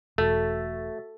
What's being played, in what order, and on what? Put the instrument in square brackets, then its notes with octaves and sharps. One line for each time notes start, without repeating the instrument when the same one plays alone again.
[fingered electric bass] E1 [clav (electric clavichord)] A3 [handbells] F#4 E5 A6 [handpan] A4